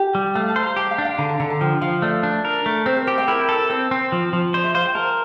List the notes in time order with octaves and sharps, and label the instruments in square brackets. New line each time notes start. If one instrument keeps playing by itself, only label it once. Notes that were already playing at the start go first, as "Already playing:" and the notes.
Already playing: [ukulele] G4
[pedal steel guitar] G3
[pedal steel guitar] A3 [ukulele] F5
[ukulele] A5
[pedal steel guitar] C5
[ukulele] A#5
[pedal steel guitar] G4 [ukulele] A5
[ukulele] G5
F5
[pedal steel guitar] D4
[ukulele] F5
[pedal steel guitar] D3 [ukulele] A#5
[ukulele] A5
[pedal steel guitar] D3 [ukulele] A#5
[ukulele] A5
[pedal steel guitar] F3 [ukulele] G5
[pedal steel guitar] F3 [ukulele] F5
[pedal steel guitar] A3 [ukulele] D5
[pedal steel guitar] D4
A#4
A3
[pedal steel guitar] C4 [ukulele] C5
[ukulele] A#4
[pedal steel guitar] G4 [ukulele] C5
[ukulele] G5
[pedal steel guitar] E4 [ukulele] A#4
[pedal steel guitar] A4
[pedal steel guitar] C4 [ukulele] C5
[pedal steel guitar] C4
F3
F3
[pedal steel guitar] C5 [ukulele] D5
[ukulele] E5
[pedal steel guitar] C5 [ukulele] F5
[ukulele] G5
[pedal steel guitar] A#4 [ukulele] A5